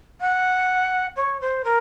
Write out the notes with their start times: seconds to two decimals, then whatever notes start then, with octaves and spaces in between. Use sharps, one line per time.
0.21 F#5
1.16 C#5
1.40 C5
1.64 A#4